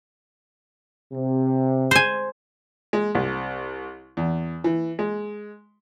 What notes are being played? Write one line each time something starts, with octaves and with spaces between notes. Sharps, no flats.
C3
C5 G#5
G#3
C2
E2
E3
G#3